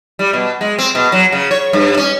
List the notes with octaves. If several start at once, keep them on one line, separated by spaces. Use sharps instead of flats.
G3
B2
G#3
C4
B2
F#3
C#3
C#5
G2
C#4